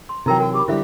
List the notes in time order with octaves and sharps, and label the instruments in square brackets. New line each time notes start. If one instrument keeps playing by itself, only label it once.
[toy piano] C6
[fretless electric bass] C3 E3 F#3 [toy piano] D#4 A#4 G5 [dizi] A#5
[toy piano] F#4 A#4 [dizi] G5
[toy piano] G4 B5 [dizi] D6
[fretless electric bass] D3 F#3 G3 [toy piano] E4 C5 E5 [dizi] G4